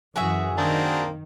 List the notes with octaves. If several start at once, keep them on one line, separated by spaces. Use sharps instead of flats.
F#2 E3 F#4 G#4 E5
D#3 A#3 C4 D4 D#4